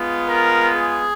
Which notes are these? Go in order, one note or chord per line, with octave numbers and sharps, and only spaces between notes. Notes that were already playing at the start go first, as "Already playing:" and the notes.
Already playing: G#3 B3 F4
A#4
G#4